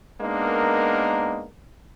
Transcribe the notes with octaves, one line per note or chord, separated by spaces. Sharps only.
G#3 A#3 B3 D4 D#4 A#4